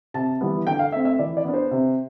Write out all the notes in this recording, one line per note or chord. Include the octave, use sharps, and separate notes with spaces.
C3 A5
E3 G3 B3
D3 G5
F5
A3 C4 E5
E5
E3 D5
D5
B3 D4
C5
C3